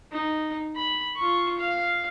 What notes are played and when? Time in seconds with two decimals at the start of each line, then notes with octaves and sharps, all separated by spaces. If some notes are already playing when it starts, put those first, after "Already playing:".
0.12 D#4
0.76 B5
1.17 F4 C#6
1.59 F5